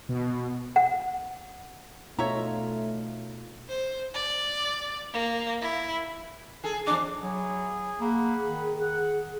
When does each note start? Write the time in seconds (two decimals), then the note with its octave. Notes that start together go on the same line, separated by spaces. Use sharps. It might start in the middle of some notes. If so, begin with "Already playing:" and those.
0.09 B2
0.76 F#5
2.19 B2 A3 D#4 F4 C#5 E5 A#5
3.69 C5
4.14 D5
5.13 A#3
5.61 E4
6.64 G#4 A4
6.87 F2 D4 D6
7.23 F#3 E4 G#4
8.01 A#3 G#4 F#5 B5
8.44 D#3
8.79 G#4 F#5